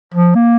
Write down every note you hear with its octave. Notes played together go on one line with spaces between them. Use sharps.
F3
A#3